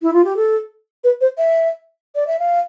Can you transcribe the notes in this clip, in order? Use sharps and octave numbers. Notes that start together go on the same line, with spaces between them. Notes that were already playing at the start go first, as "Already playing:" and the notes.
E4
F4
G4
A4
B4
C5
E5
D5
E5
F5